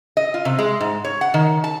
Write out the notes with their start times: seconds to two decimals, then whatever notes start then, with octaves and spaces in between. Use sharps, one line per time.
0.17 D#5
0.34 F4
0.45 C3
0.59 G#3
0.81 G#2
1.05 C#5
1.21 F#5
1.34 D#3
1.64 A5